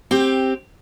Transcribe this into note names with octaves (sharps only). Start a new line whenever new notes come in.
C4 G4